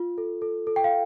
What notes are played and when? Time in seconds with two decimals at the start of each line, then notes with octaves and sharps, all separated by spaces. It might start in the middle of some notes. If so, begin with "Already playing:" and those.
Already playing: F4
0.18 A4
0.42 A4
0.67 A4
0.76 G5
0.84 F5